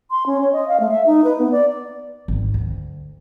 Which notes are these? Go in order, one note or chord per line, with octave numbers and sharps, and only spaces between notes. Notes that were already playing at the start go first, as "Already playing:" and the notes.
C6
C#4
C#5
D#5
F5
A3
E5
D#4
B4
B3
D5
G#1
D2